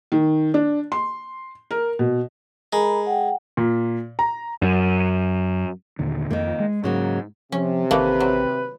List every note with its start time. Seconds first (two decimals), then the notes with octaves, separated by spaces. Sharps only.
0.12 D#3
0.54 D4
0.92 C6
1.71 A#4
1.99 B2
2.73 G#3 A#4 A#5 B5
3.07 F#5 G5
3.57 A#2
4.19 A#5
4.62 F#2
5.99 D#2 A#2 D3
6.31 F2 D#3 A#3
6.60 G#3
6.84 G#2 C#3 F#3 A#3
7.52 C3 F3 C#4
7.91 A1 D#3 A3 A#3 B4
8.20 F#3